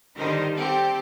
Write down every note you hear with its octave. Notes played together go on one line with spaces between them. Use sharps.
D3 D#3 G3 D#4 A#4 C5
C4 G4 A4